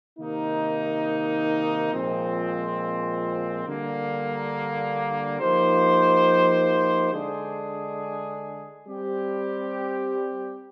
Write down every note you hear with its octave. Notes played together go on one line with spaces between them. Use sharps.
C3 D#3 A#3 D#4
A#2 F3 G#3 C4
D3 G3 A#3
F3 A#3 D#4 G4 C5
D3 G#3 D4 G#4
G3 C4 G4